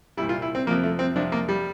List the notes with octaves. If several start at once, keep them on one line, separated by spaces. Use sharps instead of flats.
C2 A#2 G3 E4
F4
E4
C4
F2 C3 F3 A#3
A3
C4
F2 C3 F3 D4
A#3
G3